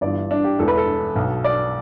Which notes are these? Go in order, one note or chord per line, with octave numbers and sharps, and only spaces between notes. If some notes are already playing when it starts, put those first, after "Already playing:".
G1 G2 E3 D5
D4
G4
E1 E2 E3 A4
B4
A4
B1 B2
D5